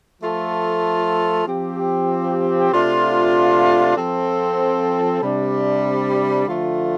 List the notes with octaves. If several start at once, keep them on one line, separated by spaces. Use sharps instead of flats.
F3 A3 F4 A4
F3 C4 G4
C3 A3 D4 F4
F3 C4 A4
C3 G3 D4
D3 F3 A3 F4